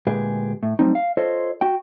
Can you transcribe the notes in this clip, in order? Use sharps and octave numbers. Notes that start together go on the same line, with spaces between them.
D2 A#2 G#3 G4 G#4 B4
A2
F#3 G3 A3 C4 D#4
F5
F4 A4 C5 C#5 D#5
F#4 G5